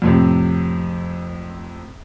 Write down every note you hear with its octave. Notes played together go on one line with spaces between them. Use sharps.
F2 A2 C3